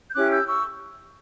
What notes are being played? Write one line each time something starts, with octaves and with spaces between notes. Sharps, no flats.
G6
C#4 E4 G4 D6 F#6
E6 G6
C#6 E6